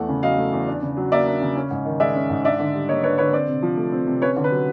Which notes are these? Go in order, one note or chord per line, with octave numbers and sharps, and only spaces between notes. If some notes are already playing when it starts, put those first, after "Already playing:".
Already playing: E2 A3 F#5
C#3
F#3 D#5 F5
A3
E2
D4
C#3
F#3
A#3 D5 E5
D4
C#3
C#4
G#2
D#3
G#3 D5 E5
C#4
G#2
D4 D5 E5
D3
G3
A#3 C#5 D#5
D4 B4 C#5
D3 B4 C#5
C4 C5 D5
C3
F3
A3
C4
C3
C#4 B4 C#5
D3
B4
F#3